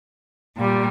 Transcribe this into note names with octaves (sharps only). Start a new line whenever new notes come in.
A#2 G3